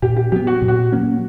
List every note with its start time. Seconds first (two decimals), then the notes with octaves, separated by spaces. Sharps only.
0.02 A#2 G4
0.17 G4
0.32 F#3 B3 G4
0.47 F#4
0.61 A#2
0.68 F#4
0.92 F#3 A#3 C#4